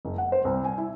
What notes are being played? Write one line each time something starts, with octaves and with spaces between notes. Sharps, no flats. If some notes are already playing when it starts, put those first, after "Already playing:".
F#1
F#5
C5
C2
G#5
E4